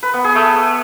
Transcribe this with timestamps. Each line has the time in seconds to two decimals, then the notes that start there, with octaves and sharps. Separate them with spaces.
0.03 B4
0.13 B3
0.24 G#4
0.35 A3